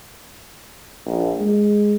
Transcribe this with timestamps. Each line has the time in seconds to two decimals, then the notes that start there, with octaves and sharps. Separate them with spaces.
1.06 A#1
1.39 G#3